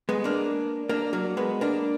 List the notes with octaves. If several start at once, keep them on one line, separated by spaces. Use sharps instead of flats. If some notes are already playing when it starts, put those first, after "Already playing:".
G#3 B3
A#3 D4
A#3 D4
F#3 A#3
G#3 B3
A#3 D4